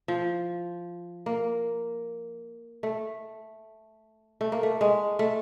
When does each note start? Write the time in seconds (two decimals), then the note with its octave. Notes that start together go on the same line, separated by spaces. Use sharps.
0.08 F3
1.26 A#3
2.83 A3
4.41 A3
4.52 A#3
4.63 A3
4.81 G#3
5.19 A3